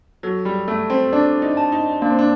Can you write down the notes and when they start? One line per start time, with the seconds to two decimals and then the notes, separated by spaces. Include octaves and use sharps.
0.23 F#3 A4
0.45 G3
0.68 A3 A4
0.90 C4
1.13 D4 D5
1.42 D#4
1.57 A5
1.72 D#4
2.02 A#3 D4
2.10 C4
2.19 D4